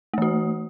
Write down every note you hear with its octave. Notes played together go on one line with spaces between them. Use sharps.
E3 A3 F#4